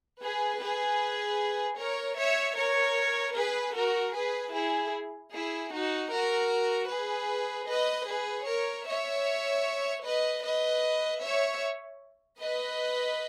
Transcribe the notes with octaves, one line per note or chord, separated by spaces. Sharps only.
G#4 B4
G#4 B4
A#4 C#5
C#5 E5
A#4 C#5
G#4 B4
F#4 A#4
G#4 B4
E4 G#4
E4 G#4
D#4 F#4
F#4 A#4
G#4 B4
B4 D#5
G#4 B4
A#4 C#5
C#5 E5
B4 D#5
B4 D#5
C#5 E5
B4 D#5